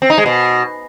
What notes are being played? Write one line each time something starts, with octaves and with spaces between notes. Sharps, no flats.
C4
D#4
G#3
B2